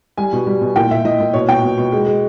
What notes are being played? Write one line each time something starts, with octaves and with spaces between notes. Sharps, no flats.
G3 G#5
B2
G3
B2
A#2 G5
A#2 E5
A#2 D#5
A#2
B2 C#5
B2 G5
B2
B2
G#3
G#3